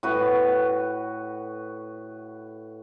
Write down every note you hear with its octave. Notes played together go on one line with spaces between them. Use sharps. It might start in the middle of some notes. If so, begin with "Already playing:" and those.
A2 F#4 B4